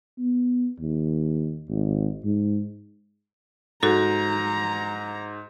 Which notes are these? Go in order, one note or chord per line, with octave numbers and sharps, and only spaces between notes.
B3
D#2
G#1
G#2
G#2 F#4 A4 A#5